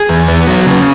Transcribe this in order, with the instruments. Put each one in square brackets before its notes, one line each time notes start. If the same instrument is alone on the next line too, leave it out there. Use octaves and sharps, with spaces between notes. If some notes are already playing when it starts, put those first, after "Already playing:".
Already playing: [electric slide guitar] G#4
E2
B3
F#3
C#3